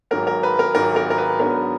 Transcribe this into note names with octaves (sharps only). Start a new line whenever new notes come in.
G#1 G#2 F#3 A#4
A#4
B4
A#4
G#1 G#2 F#3 A#4
A#4
A#4
B4
G#2 F#3 B3 D4 A#4